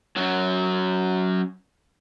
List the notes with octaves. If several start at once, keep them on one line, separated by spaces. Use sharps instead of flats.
F#2 F#3